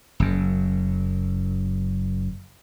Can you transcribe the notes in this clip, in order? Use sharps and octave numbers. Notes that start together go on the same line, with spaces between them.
F#1 F#2